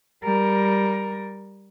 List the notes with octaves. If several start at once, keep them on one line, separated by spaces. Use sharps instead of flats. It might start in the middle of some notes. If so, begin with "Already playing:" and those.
G3 A#4